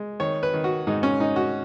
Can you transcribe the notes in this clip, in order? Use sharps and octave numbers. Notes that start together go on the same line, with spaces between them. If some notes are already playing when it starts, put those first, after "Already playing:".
Already playing: G#3
D#3 C#5
B4
D#3
F#4
G#2 D#4
C#4
G#2 D#4
F#4